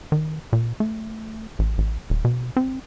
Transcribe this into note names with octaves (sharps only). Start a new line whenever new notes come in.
D#3
A#2
A3
A1
A1
D#1
B2
C4